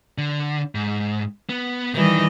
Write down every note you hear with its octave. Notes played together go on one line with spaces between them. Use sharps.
D3
G#2
B3
D#3 E3 G3 D#5